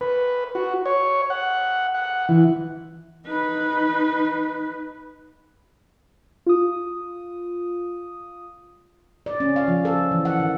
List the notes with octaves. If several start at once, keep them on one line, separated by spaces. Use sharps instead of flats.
B4
F#4
C#5
F#5
F#5
E3
D#4 B4
F4 D#6
D5
C#4
F5
F3
A4
E3
F#5
D#3